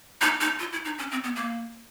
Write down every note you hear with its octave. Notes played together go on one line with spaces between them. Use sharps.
D#4
D#4
F4
E4
D#4
C#4
C4
B3
A#3